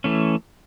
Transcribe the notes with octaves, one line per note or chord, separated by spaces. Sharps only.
E3 A3 C#4